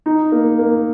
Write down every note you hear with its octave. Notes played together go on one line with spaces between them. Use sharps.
D#4
A#3
A#3